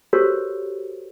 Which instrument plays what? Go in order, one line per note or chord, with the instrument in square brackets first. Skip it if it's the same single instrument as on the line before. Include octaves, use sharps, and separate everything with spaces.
[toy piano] F#4 G4 A4 A#4 C5 C#5